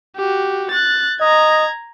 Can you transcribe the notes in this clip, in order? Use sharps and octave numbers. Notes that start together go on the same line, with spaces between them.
F#4 G4
F#6 A6
D#5 A#5 G#6